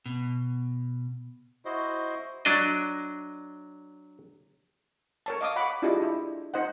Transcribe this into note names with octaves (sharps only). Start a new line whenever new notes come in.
B2
E4 F#4 C5 D#5
F#3 D4 D#5
A#4 C#5 A5
D#5 F5 D6 D#6
C#5 F#5 B5 D6
D4 E4 F4 G4 G#4 D#5
E4
D#4 C5 D#5 F#5